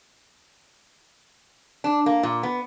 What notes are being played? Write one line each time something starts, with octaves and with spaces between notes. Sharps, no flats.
D4
A#3
A#2
B3